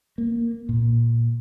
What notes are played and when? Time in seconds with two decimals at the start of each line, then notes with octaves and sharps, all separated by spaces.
0.18 A#3
0.69 A#2